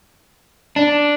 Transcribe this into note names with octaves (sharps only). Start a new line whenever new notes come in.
D4